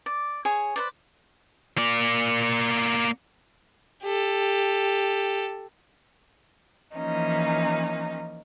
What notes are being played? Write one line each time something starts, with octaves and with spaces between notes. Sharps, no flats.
D5
G#4 C#5
B4 C5 D5
A#3 D5
G4 A4
E3 F3 A#3 C#4 D#4